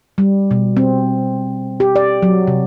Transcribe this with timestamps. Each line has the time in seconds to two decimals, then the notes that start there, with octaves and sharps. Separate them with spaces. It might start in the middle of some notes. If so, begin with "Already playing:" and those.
0.18 G3
0.51 B2
0.77 C4
1.80 G4
1.96 D5
2.23 F#3
2.48 C3